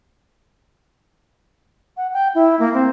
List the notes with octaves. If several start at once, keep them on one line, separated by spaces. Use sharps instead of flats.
F#5
G5
E4
A#3
C4